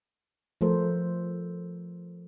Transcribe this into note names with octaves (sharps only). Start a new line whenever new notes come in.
F3 A3 A4 A#4 C5